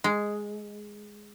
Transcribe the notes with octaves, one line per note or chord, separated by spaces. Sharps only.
G#3